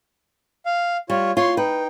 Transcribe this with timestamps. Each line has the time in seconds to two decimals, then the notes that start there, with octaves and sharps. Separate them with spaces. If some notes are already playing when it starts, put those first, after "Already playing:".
0.66 F5
1.10 G3 F4 C#5
1.37 F4 C#5 C6
1.57 D#4 B4 G5